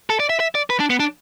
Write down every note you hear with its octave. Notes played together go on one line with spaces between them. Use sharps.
A4
D5
E5
E5
D5
B4
D4
B3
D4